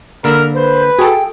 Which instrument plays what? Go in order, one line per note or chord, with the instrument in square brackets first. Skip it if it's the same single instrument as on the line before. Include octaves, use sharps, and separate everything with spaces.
[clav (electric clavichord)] D3 A#3 [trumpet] A#4 [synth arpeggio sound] B5 E6
[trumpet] B4 [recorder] C5
[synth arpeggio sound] F#4 A4 [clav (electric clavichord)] G#4 [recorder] G5